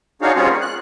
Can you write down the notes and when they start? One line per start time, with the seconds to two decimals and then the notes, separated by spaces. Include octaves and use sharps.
0.22 D4 D#4 F#4 G#4 C#5 F5
0.36 G3 C4 C#4 F4 G#4 C#5
0.50 A#3
0.61 F#6